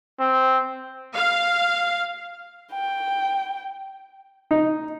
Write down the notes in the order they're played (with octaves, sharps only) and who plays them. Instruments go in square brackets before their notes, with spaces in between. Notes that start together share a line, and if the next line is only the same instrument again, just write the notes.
[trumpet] C4
[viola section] F5
[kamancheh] G5
[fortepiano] D#4